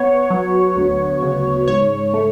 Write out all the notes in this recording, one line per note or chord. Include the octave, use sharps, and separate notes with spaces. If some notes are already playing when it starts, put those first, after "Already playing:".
Already playing: B3 C#5
F#3
D2
C#3
G#2 C#5
A3